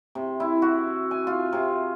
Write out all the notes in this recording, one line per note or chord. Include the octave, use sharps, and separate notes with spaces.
C3
E4
F#4
G#5
F4
C3